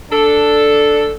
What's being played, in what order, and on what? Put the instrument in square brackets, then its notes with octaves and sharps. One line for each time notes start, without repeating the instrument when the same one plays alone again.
[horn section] D4 A4